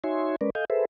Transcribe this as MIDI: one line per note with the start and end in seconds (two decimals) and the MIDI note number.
0.04 0.36 63
0.04 0.36 66
0.04 0.36 73
0.04 0.36 76
0.04 0.36 80
0.04 0.36 84
0.41 0.50 56
0.41 0.50 61
0.41 0.50 70
0.41 0.50 71
0.41 0.50 74
0.55 0.65 69
0.55 0.65 75
0.55 0.65 77
0.55 0.65 80
0.55 0.65 91
0.70 0.85 68
0.70 0.85 69
0.70 0.85 71
0.70 0.85 72
0.70 0.85 76